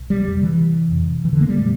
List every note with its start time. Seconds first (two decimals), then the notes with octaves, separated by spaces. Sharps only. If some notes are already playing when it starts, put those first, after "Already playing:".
Already playing: C2
0.10 G3
0.26 F2 C3
0.43 E3
0.92 F2 C3
1.25 E3
1.33 D3
1.41 A#3
1.49 G3
1.58 A#2 A3